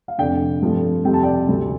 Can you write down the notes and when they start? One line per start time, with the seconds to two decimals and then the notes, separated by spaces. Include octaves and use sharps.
0.08 F5
0.18 F1 F2 D3 D5 G5
0.61 G2 F3 A3 C4
1.05 F2 C3 G3 C4 G5
1.14 A5
1.23 D5 G5
1.48 D2 C3 G3 C4